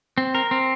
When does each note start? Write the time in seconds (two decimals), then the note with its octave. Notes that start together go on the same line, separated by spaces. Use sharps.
0.18 C4
0.35 A#4
0.51 C4